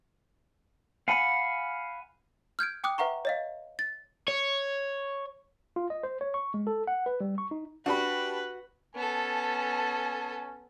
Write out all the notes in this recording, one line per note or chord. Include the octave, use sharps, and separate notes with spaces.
F5 F#5 G#5 B5
F6 G6 G#6 D7
G5 D6 D#6 F#6
B4 E5 F#5 A#5 C#6
C#5 D#5 F5
A6
C#5
F4
D#5
C5
C#5
C#6
G#3
A4
F#5
B4
G3
C#6
D#4
D4 F#4 G4 B4 B5
B3 C#4 A4 G#5 A5